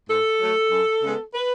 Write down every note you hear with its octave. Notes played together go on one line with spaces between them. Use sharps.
G#2 A4
F#3 A3
F#2
C#3 G#3 B3
B4